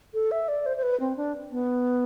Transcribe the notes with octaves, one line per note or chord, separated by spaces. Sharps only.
A4
E5
D5
C5
C5
B4
C4
D4
B3